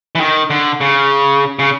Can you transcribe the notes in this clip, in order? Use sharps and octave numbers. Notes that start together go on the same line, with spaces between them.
E3
D#3
D3
C#3
C#3